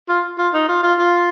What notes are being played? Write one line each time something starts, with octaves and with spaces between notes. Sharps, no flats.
F4
F4
D#4
F4
F4
F4